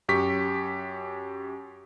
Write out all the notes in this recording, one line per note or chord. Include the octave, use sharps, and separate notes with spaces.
F#2 G4 C#6 B6